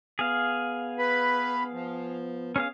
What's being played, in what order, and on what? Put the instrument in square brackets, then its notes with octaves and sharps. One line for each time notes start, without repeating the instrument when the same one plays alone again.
[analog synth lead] B3 [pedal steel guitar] G#4 F5
[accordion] B4 B5
F3
[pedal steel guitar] C#4 G#4 F5